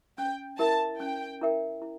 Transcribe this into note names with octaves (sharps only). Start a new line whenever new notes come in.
C#4 G5
E4 A#4 E5 G5 A5
C#4 G5
E4 A#4 E5 G5
E4